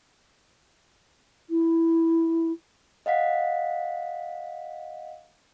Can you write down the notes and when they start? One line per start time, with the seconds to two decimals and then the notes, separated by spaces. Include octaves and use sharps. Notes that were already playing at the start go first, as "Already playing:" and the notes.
1.50 E4
3.06 D#5 F5 F#5 B6